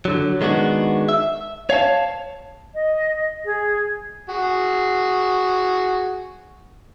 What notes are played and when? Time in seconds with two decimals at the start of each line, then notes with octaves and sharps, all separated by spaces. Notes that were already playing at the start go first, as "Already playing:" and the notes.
0.05 D3 F#3
0.41 D#3 G#3 B3 D4 F#4
1.09 E5
1.70 C#5 F5 G#5 A5
2.74 D#5
3.44 G#4
4.29 F#4 G#4